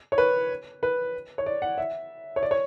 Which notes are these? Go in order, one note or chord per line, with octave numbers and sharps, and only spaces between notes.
C#5
B4
B4
C#5
D5
F#5
E5
C#5
D5
C#5